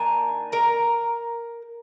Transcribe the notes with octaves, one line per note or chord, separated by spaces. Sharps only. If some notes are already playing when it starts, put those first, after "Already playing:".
Already playing: D#3 A#3 D4 G#5
A#4 A#5